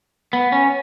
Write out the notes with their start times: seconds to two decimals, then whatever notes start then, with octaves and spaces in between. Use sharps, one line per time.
0.33 B3
0.52 C#4